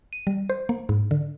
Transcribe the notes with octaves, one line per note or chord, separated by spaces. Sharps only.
D#7
G3
C5
A#3
G#2
D3